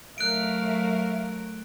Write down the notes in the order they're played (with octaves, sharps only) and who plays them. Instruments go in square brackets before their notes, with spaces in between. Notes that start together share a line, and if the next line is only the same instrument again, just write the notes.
[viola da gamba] F#3 A3 A#4 [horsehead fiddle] E5 F5 [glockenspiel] F#6 D7